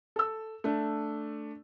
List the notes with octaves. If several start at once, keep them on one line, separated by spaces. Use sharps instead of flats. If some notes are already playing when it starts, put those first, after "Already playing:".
A4 E6
A3 D4